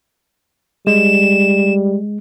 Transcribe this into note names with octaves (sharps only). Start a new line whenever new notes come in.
G3 G#3 E7